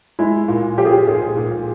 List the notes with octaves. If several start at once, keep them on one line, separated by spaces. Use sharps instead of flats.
G#3 E4
A#2 F4
F3 G4
G#4
G4
A#2 G#4
A#2